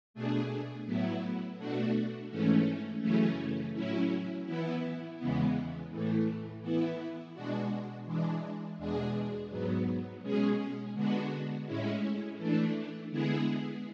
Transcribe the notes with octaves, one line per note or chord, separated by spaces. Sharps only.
B2 A3 D4 G#4
A2 F#3 B3 E4
B2 A3 D4 F#4
G#2 E3 A3 C#4
F#2 C#3 E3 A3 C#4
A2 F#3 C#4 E4
E3 B3 E4
E2 C#3 E3 G#3 B3
A2 E3 A3
E3 B3 E4
B2 G#3 D4 F#4
E3 G#3 D4
E2 B2 G#3 D4 G#4
G#2 F#3 B3
B2 G#3 C#4 G#4
D3 G#3 B3 D4 F#4
A2 G#3 C#4 E4
E3 A3 D4
D3 G#3 B3 E4 G#4